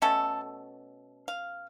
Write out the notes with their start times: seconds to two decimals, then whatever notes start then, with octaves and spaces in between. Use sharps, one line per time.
0.02 B2 A3 C#4 A4
1.28 F5